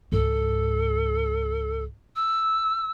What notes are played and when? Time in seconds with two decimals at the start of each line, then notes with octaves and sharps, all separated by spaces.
0.12 C#2 G#2 A4
2.16 E6